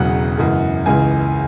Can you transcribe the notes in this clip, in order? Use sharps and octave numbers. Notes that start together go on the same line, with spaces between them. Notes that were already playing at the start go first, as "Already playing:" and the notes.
Already playing: E1 E2 C#3 F#3 F#5
F#2 C#3 E3 G#3
C#2 C#3 E3 G#5